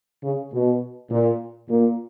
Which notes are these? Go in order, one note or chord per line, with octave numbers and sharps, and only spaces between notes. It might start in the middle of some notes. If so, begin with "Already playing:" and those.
C#3
B2
A#2
A#2